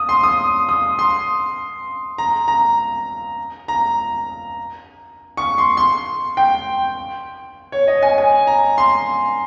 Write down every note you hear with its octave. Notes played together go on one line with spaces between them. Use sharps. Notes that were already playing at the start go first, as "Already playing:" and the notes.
Already playing: D#6
C6
D#6
D#6
C6
A#5
A#5
A#5
C#6
C6
C6
G5
C#5
D#5
G#5
G#5
A#5
C6